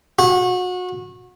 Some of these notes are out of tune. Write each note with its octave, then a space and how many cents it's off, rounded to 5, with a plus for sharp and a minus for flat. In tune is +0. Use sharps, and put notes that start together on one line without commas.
F#4 -30